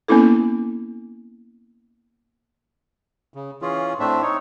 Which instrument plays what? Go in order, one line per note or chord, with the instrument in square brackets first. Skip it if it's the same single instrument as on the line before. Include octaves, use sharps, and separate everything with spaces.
[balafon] A#3 B3 C#4 E4 A4
[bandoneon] C#3
E3 C#4 F4 G#4
A2 A3 C4 D4 E5
D#4 C#5